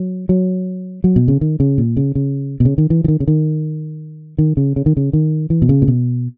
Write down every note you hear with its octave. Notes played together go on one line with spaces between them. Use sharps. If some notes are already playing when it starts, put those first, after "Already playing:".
Already playing: F#3
F#3
F#3
B2
C#3
D#3
C#3
A#2
C#3
C#3
B2
C#3
D#3
E3
E3
D#3
C#3
D#3
D#3
C#3
C#3
D#3
C#3
D#3
E3
B2
C#3
A#2
B2